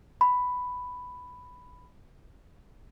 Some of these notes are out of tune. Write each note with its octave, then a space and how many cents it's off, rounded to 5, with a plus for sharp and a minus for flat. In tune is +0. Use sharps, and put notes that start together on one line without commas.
B5 +5